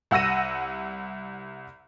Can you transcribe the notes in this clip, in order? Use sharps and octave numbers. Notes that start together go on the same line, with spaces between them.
C2 F#5 E6 A#6 D#7